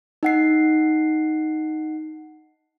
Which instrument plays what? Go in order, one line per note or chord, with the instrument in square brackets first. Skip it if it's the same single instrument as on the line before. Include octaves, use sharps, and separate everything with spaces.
[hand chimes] D#4 F#5 C7